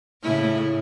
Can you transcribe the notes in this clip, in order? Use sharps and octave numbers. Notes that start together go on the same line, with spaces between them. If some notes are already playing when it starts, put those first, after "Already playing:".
A2 C#3 E4